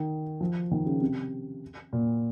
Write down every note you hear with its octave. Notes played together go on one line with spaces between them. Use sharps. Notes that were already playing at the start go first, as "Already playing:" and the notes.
Already playing: D#3
F3
D#3
C#3
C3
A#2